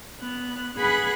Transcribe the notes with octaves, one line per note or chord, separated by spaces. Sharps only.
B3 F#6
G#4 B4 F#5 B5 F#6 G#6